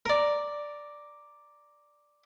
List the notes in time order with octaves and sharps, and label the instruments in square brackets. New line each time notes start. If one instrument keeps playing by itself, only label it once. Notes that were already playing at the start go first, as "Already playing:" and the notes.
[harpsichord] A#4 D5